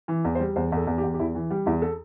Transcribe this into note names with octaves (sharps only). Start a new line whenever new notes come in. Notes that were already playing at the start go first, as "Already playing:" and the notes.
E3
E2
C5
G3
E2 C5
E2 A4
E2
G4
E2
G4
E2 E4
E3
G3 G4
E2 E4
A4